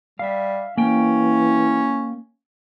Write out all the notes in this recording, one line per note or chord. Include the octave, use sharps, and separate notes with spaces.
G3 E5 F5
E3 A#3 C#4 G5